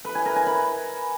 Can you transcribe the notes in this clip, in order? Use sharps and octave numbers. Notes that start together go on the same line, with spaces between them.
B4
G#5
A#4
G#5
B5